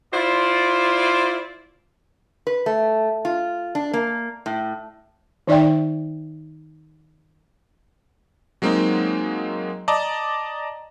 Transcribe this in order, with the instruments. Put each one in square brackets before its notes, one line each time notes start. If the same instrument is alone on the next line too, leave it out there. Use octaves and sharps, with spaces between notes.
[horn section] E4 F4 C5 D5
[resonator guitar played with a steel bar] B4
A3
F4
D4
A#3
A2
[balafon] D#3 D#4 D5 E5 G5
[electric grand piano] F#3 G#3 A#3 C4 D#4
D5 D#5 A5 A#5